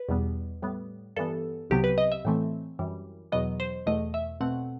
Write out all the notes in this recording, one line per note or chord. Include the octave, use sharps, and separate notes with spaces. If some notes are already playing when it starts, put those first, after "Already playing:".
Already playing: B4
E2 B2 G3 B3
A2 G3 B3
G2 E3 B3 A4
C2 C3 F#3 B3 G4
B4
D#5
E5
A2 E3 A3 C4
F#2 E3 G3
E2 B2 F#3 B3 D#5
C5
E2 B2 A3 D#5
E5
B2 A3 C4 F#5